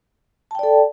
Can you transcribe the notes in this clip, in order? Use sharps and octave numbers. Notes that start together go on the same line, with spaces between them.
A4 D5 G5 A5